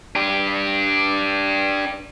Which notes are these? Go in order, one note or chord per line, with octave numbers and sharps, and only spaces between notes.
D4 G4